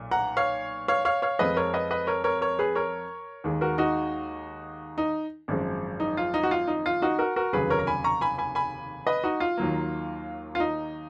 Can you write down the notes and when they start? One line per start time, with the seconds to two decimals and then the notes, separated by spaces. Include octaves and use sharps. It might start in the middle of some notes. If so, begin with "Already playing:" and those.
Already playing: B1 A#2
0.11 F#5 A#5
0.37 C#5 F5
0.88 C#5 F5
1.05 C#5 F5
1.22 C#5 F5
1.39 F2 F3 G#3 B4 D#5
1.57 A#4 C#5
1.74 B4 D#5
1.91 B4 D#5
2.07 A#4 C#5
2.24 A#4 C#5
2.41 A#4 C#5
2.59 G#4 B4
2.75 A#4 C#5
3.44 D#2 D#3 G#3
3.61 F#4 A#4
3.78 D#4 F#4
4.98 D#4
5.48 G#1 F#2 F3 G#3
6.00 D#4
6.17 F4
6.34 D#4
6.43 F#4
6.51 F4
6.67 D#4
6.86 F4
7.02 D#4 F#4
7.19 F#4 A#4
7.36 F#4 A#4
7.53 F1 D#2 C#3 F#3 G#4 B4
7.70 A#4 C#5
7.79 A#5
7.87 G#5 B5
8.04 A#5 C#6
8.21 G#5 B5
8.38 G#5 B5
8.55 G#5 B5
9.07 B4 D#5
9.24 D#4 F#4
9.40 F4
9.58 D#2 D#3 F#3 A#3
10.55 F4
10.60 D#4